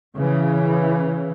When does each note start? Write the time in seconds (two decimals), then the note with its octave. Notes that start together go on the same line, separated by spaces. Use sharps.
0.16 C#3 E3